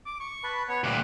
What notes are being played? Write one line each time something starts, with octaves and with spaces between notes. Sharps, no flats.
D6
C#6
B4 A5 B5
B3 C#5 C#6
D2 A#2 G4 F#5